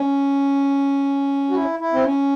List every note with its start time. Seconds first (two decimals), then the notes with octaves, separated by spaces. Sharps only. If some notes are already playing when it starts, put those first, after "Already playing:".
Already playing: C#4
1.50 F#4
1.55 E4
1.79 E4
1.93 C4
2.04 C#4